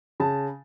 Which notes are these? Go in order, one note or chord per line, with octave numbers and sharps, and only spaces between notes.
C#3 A5